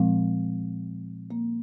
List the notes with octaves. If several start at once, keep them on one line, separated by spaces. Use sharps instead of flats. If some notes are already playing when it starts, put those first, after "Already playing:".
Already playing: A#2 F3 G#3 C4
A#3